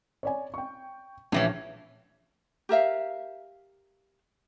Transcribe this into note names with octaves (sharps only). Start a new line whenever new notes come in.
C#5 D5 G#5
G5 C#6
A#1 A2 E3 C#4
G4 A#4 E5 F5